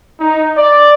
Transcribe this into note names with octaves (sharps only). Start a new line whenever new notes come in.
D#4
D5